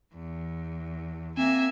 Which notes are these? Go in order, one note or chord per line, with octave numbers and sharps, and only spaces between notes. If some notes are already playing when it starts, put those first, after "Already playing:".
E2
A#3 C4 E5 G#5